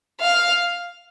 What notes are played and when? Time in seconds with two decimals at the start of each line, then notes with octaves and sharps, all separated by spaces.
0.21 F5